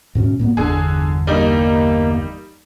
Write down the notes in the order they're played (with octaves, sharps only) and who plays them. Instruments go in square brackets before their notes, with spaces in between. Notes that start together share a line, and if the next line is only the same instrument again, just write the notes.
[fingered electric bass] G#2 B2 C#4
A2 A#3 B3
[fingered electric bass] G1 E2 [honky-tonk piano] D3 G#4
[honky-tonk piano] G3 D#4 [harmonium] A#3